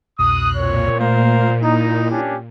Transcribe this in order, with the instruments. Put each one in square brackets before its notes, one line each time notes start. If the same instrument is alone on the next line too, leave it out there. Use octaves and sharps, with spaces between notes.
[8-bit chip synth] C2 F2 B2 [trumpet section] D#6 [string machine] F#6
[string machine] A#2 [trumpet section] C4 C#5
[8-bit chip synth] A3 [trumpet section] A#4 C5 F5
[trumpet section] D#4 [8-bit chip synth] E4
[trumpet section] C#4 D4 G4